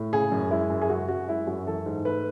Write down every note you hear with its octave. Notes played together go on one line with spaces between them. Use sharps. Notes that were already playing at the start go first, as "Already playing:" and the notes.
Already playing: A2
C#3 G#4
F#2
G#3 E4
F#2
G#4
C#3 F#4
F#2 F#4
G#3 E4
F#2 F#4
E3 A4
G#2
A3 B4